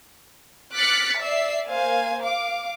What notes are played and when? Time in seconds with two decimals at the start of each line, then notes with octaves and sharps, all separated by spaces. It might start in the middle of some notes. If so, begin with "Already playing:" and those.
0.75 D6 F6 F#6 A6 B6 C#7
1.19 D5 E5 E6 C7
1.68 A#3 C5 F5 G#5
2.22 F5 D6